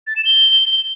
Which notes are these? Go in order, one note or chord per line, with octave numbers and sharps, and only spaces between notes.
A6
E7
G7